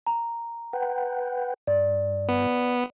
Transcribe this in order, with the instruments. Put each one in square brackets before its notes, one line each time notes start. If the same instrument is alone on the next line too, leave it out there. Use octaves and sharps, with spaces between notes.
[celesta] A#5
[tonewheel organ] B4 F#5 G5
[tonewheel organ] G2 [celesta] D5
[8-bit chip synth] B3